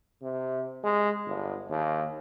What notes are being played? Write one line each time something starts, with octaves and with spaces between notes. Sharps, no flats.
C3
G#3
G1
D#2